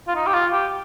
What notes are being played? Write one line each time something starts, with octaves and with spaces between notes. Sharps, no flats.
F4
D#4
G4
F4
G4